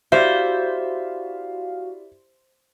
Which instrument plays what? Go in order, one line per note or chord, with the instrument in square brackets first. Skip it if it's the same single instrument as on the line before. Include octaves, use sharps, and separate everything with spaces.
[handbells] E4 G4 D5 [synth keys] F#4 F5 [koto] C5 [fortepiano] E5